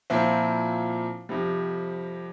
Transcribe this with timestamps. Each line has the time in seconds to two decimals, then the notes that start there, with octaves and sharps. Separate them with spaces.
0.10 A#2 F3 C4 E4
1.29 F2 C3 G3